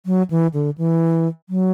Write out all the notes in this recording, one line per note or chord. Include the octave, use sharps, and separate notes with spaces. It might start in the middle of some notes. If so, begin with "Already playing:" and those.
F#3
E3
D3
E3
F#3